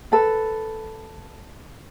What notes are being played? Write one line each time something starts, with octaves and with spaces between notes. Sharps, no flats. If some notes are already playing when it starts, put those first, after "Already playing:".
A4 B4